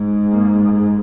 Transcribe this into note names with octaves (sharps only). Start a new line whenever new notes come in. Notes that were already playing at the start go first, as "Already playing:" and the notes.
Already playing: G#2
A#3